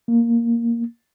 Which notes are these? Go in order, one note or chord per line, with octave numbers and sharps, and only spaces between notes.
A#3